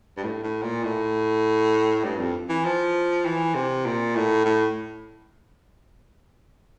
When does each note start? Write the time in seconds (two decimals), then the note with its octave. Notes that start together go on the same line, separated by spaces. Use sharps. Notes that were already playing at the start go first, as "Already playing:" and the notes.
0.17 G2
0.24 A2
0.43 A2
0.63 A#2
0.84 A2
2.04 G2
2.19 F2
2.49 E3
2.65 F3
3.26 E3
3.55 C3
3.86 A#2
4.16 A2
4.45 A2